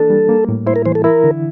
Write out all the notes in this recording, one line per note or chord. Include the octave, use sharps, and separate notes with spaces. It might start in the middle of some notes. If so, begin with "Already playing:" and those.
Already playing: E3 A#3 D4 A4
G3
A#3
A2
E4 C5
A#4
E3 C5
A4
E4 A#4
D3